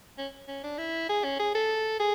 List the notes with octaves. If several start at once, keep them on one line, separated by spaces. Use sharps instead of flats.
C#4
C#4
D4
E4
G#4
C#4
G#4
A4
G#4